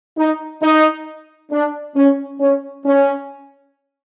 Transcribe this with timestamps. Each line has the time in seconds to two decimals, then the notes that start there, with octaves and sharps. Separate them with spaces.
0.18 D#4
0.62 D#4
1.52 D4
1.96 C#4
2.41 C#4
2.85 C#4